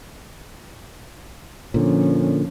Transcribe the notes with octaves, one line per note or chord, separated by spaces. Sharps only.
A#2 D3 F3 C#4